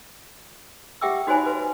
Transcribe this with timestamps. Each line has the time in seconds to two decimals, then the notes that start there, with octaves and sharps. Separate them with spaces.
1.01 G4 E5 F#5 G5 D6 E6
1.27 D#4 F#4 C5 C#5 G#5 B5
1.46 B4